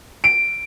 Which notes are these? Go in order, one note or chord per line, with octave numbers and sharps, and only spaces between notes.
D7